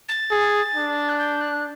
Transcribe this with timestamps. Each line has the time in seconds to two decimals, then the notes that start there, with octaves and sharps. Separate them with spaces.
0.09 A6
0.31 G#4
0.75 D4
1.09 F#6
1.19 G6
1.41 F#6